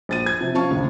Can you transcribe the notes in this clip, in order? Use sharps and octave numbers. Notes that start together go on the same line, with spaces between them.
A#1 A6 D#7
G#6
C3 F3
F3 C#4 F5 A5 C#6
A#1 D#2 A2 C#3